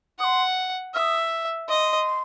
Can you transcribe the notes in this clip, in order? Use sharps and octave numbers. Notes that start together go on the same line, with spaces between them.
F#5 C6 D#6
E5 D#6 F6
D#5 C6